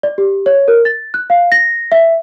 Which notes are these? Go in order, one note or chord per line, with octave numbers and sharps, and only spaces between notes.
D5
G4
C#5
A#4
A6
F#6
F5
A#6
E5